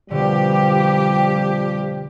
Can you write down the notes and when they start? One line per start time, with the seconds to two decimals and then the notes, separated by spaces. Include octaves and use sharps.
0.11 F2 B2 D3 F3 G3 G4